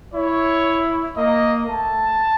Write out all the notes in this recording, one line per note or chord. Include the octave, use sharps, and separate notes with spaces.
E4 C#5
A#3 D#5
A3 A5